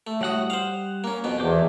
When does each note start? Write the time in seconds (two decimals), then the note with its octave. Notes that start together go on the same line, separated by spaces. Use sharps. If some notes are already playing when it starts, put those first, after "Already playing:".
0.07 A3
0.21 A2 G3 F#4 F#5 D#6
0.50 C5 F5
1.04 A#3 C#4
1.24 F2 B2 B3
1.40 E2 C5 D6